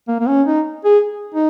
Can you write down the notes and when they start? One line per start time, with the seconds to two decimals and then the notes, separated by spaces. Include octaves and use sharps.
0.08 A#3
0.20 A#3
0.28 C#4
0.47 D#4
0.85 G#4
1.35 D#4